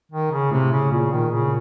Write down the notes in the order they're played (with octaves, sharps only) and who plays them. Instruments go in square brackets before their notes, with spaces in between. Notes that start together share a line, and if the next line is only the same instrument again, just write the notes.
[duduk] D#3
C#3
[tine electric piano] A2 [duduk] C3
[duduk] C#3
[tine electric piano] A#2 [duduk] C#3
[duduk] D#3
C#3